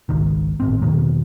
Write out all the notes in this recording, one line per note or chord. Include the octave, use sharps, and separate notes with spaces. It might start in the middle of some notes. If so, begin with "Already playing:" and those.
G#1 C#2 D#3
G#1 A2 C4
E2 B2 D#3 A#3